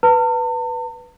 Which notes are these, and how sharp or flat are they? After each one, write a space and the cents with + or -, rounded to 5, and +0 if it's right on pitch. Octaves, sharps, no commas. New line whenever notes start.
B4 +0 A5 +45